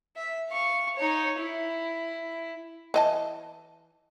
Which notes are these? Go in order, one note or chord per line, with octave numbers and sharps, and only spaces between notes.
E5
F5 C#6
D#4 C#5
E4
E3 D#5 A5